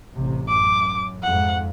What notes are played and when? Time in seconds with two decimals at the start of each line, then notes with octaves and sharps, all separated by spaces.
0.14 A1 C3
0.48 F#2 D6
1.23 F2 G#2 F#5